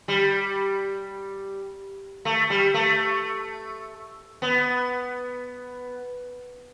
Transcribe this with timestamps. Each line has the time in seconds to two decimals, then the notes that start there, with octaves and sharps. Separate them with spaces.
0.08 G3
2.25 A3
2.50 G3
2.74 A3
4.42 B3